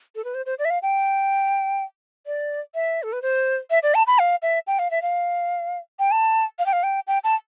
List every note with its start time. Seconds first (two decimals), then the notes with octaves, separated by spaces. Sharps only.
0.16 A4
0.24 B4
0.35 C5
0.46 C5
0.59 D5
0.65 E5
0.70 F5
0.82 G5
2.26 D5
2.75 E5
3.03 A4
3.13 B4
3.22 C5
3.71 E5
3.83 D5
3.95 A5
4.07 B5
4.19 F5
4.42 E5
4.67 G5
4.79 F5
4.91 E5
5.02 F5
5.99 G5
6.12 A5
6.59 F5
6.66 G5
6.73 F5
6.83 G5
7.07 G5
7.24 A5